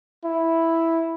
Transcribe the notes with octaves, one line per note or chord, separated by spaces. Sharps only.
E4